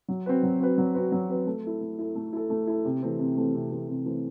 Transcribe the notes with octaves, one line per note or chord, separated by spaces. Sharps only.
F#3
C4 F#4 B4
F#3
C4 F#4 B4
F#3
C4 F#4 B4
F#3
C4 F#4 B4
A3
E4 A4
A3
E4 A4
A3
E4 A4
A3
E4 A4
C3
E3 A3 C4
C3
E3 A3 C4
C3
E3 A3 C4
C3
E3 A3 C4